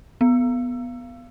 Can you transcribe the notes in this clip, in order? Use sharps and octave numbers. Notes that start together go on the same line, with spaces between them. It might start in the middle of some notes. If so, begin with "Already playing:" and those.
B3